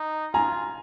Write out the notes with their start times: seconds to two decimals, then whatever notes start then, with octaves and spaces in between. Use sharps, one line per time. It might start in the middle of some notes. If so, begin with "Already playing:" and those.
Already playing: D#4
0.34 F4 G#5 A#5